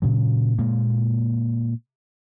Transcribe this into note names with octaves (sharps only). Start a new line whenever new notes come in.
A#2 C#3 F#3
A#2 G#3 A#3